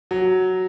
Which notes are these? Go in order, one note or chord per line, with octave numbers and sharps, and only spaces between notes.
F#3